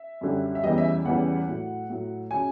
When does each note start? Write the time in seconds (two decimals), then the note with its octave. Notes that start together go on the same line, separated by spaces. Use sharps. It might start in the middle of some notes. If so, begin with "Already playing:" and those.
Already playing: E5
0.21 F#2 D3 G3
0.55 E5
0.63 E2 C#3 E3 G3 D#5
0.78 E5
1.05 E2 C#3 E3 G3 F#5
1.48 A2 F#3
1.90 A2 F#3
2.31 C#3 F#3 G#5